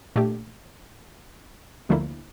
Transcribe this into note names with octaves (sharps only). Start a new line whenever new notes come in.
A#2 A3 D4 G4
D2 D3 F3 A#3 E4